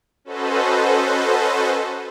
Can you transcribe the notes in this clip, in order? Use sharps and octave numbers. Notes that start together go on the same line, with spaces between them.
C#4 F#4 A4 B4 C5 D#5